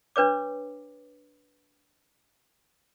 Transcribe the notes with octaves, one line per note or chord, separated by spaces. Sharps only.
D4 B4 C#5 D6